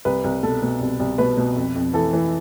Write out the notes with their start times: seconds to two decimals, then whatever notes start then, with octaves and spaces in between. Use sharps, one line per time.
0.05 C2 B4
0.24 C2
0.43 B2 A4
0.62 B2
0.81 C2
0.99 C2
1.18 B2 B4
1.37 B2
1.56 F2
1.75 F2
1.93 E3 A4
2.13 E3